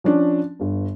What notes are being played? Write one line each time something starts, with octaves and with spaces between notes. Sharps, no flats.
F3 C#4 D4
G1 G2